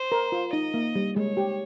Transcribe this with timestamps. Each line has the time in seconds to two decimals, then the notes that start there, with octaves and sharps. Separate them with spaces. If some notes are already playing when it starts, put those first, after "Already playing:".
Already playing: C5
0.12 A#4
0.32 F4
0.53 D#4 D#5
0.74 A#3
0.95 G3
1.16 G#3 C#5
1.37 G4